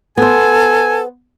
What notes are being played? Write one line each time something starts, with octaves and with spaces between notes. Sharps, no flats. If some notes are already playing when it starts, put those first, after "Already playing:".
B3 A4 C5 G#5